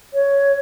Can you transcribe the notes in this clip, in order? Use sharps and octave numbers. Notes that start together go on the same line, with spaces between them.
C#5